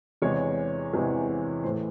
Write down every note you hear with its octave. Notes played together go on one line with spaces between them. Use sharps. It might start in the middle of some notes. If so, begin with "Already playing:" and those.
E2 C3 E3 G#3 C#5
E2 C3 E3 G#3
A2 E3 A3 C5